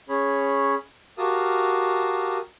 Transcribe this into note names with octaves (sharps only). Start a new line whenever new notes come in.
C#4 G#4 C#5 B5
F#4 G4 A#4 F5 A5 D#6